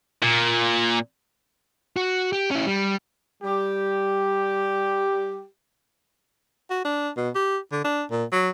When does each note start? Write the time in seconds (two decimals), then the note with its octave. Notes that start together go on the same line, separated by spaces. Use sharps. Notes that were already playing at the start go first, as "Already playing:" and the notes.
0.22 A#2
1.96 F#4
2.33 G4
2.51 C#4 E4
2.67 G3
3.42 G3 G4
6.70 F#4
6.85 D4
7.17 B2
7.35 G4
7.72 D3
7.84 D4
8.11 A#2
8.32 F#3